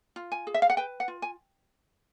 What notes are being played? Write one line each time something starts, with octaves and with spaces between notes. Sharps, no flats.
F4
G#5
G#4
E5
F5
F#5
B4 G5
F#5
F4
G#5